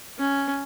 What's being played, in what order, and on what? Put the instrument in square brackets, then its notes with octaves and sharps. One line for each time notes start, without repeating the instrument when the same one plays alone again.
[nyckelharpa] C#4